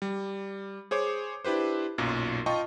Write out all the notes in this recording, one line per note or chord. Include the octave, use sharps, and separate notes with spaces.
G3
G#4 C5 C#5 D6
D4 E4 G4 B4 C5
B1 F#2 A#2
F4 D#5 G5 A5 C#6